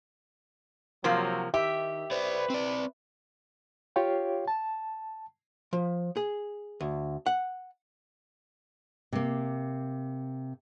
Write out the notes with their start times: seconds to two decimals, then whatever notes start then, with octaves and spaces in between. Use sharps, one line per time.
1.04 C3 F3 F#3 A#3
1.54 D#3 G4 E5
2.11 B4 C5 D5
2.50 C4 D5
3.96 F4 G4 C#5 F5 G5
4.48 A5
5.73 F3
6.17 G#4
6.80 D2
7.26 F#5
9.12 C3 A#3